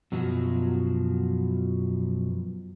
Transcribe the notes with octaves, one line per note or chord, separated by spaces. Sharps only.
F#2 B2 F3 F#3